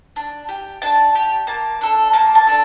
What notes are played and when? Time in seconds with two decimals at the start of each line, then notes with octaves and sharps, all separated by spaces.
0.16 D4
0.49 G4
0.82 D4 A5
1.15 G4
1.47 A#3 A5
1.81 D4 A4
2.13 A#3 A5
2.35 A5
2.47 D4 A4